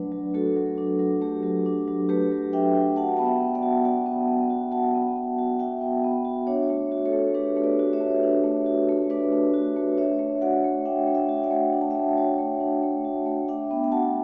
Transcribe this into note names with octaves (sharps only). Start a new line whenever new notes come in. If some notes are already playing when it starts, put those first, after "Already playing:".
Already playing: F#3 A3 D4 B4 D5
F#3
A3 F#4 A4
F#3
D4
F#3
A3 G4
F#3
D4
F#3
A3 G4 B4
F#3
D4 E5 G5
F#3
F#4 F#5 A5
B3 A5
E5 G5
B3
D5 F#5
F#4
F#4 D5 F#5
B3
B3
F#4
F#4 F#5 A5
B3
B3
F#4
F#4 E5 G5
B3
B3
F#4
D4 C#5 E5
A3
F#4
A4 C#5
A3
D4 G4 B4
A3
B4 D5
F#4
C#5 E5
A3
D4
A3
F#4
A3
D4 B4 D5
A3
F#4
A3
D4 C#5 E5
A3
F#4 D5 F#5
A3
D4 E5 G5
A3
E5 G5
F#4
D5 F#5
A3
D4 G5
A5
A3 E5 G5
F#4 C#5 E5
A3
D4
A3
F#4
A3
D4 E5 G5
B3
G5
F#4 F#5 A5